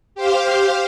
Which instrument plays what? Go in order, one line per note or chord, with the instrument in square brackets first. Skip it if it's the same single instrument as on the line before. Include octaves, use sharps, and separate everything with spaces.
[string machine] G4 C5 F5